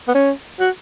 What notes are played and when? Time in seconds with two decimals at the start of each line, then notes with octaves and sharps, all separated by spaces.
0.08 B3
0.14 C#4
0.60 F#4